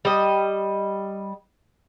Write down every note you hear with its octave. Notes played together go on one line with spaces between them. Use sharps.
G3 D#5